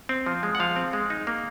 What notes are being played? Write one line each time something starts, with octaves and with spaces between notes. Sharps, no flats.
C4
F3
G#3
F#5
F3 F5
C4
G#3
D#4
A#3